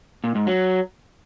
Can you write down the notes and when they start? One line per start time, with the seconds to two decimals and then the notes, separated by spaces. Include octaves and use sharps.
0.24 A#2
0.35 G#2
0.47 F#3